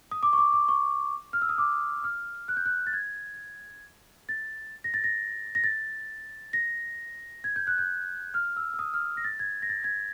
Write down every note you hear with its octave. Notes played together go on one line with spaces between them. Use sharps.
D#6
D6
C#6
D6
D6
C#6
F6
E6
D#6
D6
F6
F#6
G6
F#6
A6
G#6
A6
A#6
A6
A#6
A#6
A6
A#6
G#6
G6
F#6
G6
F6
E6
E6
D#6
F6
A#6
A6
G#6
A#6
A6
G#6